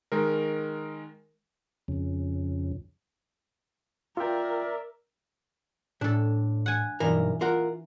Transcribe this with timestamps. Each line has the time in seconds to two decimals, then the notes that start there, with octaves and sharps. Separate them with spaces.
0.12 D#3 G#3 A#4
1.88 F2 C#3
4.17 F4 A#4 D5 E5 G5
6.01 A2 D4 A4
6.66 F#5 G#5
7.00 B1 G2 E3 A#4
7.41 F4 A#4 F#5